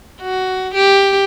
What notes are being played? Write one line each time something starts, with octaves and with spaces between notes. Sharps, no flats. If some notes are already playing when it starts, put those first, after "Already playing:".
F#4
G4